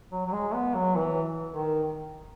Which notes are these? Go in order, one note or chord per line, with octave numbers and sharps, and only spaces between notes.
F#3
F#3
G#3
B3
F#3
E3
D#3